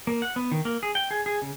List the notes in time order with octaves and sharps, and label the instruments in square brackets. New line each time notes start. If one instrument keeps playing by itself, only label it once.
[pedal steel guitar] A#3
F#5
B3
D#3
A#3
G#4
G5
G#4
G#4
C#3